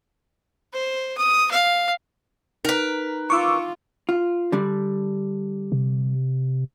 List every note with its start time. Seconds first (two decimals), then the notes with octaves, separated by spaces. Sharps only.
0.73 C5
1.18 D#6
1.51 F5
2.65 D#4 A#4 B4
3.30 F4 C#6 D6 E6
4.09 F4
4.52 D3 G3 D4
5.72 C3